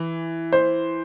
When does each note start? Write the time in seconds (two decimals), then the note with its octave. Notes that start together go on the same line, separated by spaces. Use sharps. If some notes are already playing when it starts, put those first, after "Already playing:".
Already playing: E3
0.53 C5